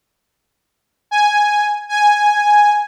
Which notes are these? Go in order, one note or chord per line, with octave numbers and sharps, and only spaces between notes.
G#5
G#5